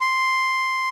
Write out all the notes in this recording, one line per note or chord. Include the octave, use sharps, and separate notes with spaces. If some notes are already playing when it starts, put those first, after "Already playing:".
C6